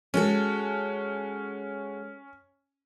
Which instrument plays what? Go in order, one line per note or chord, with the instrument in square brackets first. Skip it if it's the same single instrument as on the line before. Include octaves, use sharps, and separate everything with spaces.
[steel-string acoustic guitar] G#3 F#4 A4 [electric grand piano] C#4